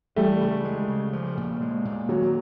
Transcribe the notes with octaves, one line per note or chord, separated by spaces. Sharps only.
E3 G3 A3
C#3
G#3
C#3
F3
A#2
G#3
A#2
D#3 F#3